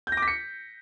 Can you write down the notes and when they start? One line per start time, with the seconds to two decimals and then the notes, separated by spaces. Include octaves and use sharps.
0.07 G6
0.12 A#6
0.17 D6
0.22 B6
0.28 C#7